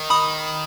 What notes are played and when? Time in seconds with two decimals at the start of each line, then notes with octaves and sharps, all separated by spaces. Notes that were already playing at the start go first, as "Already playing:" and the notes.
Already playing: D#3
0.10 B5 D#6